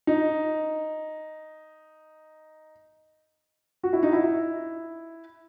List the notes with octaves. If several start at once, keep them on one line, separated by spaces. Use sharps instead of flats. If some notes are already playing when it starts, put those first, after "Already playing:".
D#4
F#4
E4
D#4
E4